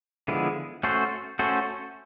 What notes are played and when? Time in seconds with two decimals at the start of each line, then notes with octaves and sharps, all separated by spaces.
0.28 D3 F3 G#3 B3 E4
0.83 A3 C#4 F#4 A4 C5
1.39 A3 C#4 F#4 A4 C5